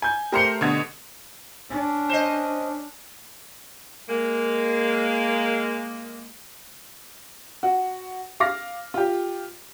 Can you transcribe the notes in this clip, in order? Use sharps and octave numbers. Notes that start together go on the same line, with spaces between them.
G#5 G6
A3 G4 A#4 C5 A#5 C6 C#7
B2 D3 G#6
C#4 D4
C5 D#5
G#3 A#3
F#4
F5 D6 F6 A#6
F4 G4